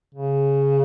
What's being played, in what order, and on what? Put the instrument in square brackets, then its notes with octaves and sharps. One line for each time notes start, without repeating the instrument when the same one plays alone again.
[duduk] C#3